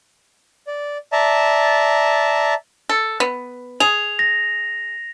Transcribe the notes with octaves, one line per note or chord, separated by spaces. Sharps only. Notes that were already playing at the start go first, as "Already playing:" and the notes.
D5
D5 E5 A5 A#5
A4
B3
G#4 F7
A#6